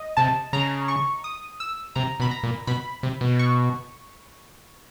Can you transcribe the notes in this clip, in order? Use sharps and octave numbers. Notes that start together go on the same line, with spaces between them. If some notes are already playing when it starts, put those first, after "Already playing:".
Already playing: D#5
C3 A5
C#3 A#5
C#6
D#6
E6
C3 A#5
B2 B5
A#5
A#2
B2 B5
C3
B2
C#6